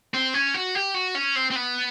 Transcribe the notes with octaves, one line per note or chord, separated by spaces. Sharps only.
C4
C#4
F#4
G4
F#4
C#4
C4
C4
B3